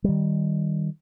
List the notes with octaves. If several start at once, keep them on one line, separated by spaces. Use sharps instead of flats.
D#3 G3